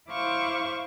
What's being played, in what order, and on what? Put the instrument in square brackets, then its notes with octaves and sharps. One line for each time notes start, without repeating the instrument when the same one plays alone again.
[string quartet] E4 C5 F5 C#6 D6